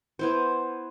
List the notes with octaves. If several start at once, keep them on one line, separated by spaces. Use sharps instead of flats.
B3 E4 C5